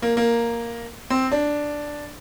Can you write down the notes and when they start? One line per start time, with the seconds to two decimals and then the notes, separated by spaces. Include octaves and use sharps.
0.02 A#3
0.17 A#3
1.10 C4
1.32 D4